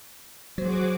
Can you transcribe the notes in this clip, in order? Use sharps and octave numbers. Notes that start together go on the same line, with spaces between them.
F#3 F#4 G#4 C5 D6